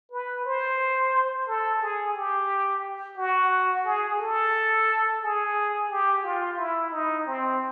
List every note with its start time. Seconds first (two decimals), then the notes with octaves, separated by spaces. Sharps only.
0.12 B4
0.45 C5
1.48 A4
1.82 G#4
2.15 G4
3.18 F#4
3.86 G#4
4.20 A4
5.22 G#4
5.90 G4
6.24 F4
6.58 E4
6.92 D#4
7.27 C4